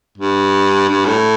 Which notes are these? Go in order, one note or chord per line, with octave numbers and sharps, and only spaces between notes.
G2
G2
A2